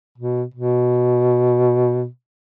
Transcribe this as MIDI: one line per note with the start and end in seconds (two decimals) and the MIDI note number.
0.18 0.43 47
0.54 2.07 47